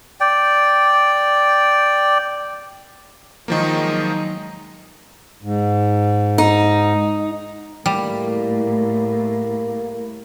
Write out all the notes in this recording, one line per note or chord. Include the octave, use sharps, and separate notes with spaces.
D5 G5
D#3 F3 F#3 G#3 A#3 D#4
G#2
D#4
A2 G3 A#3